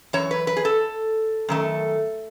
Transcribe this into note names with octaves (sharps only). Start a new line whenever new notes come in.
F#2 E3 C#5
B4
B4
G#4
A4
F#2 D#3 A3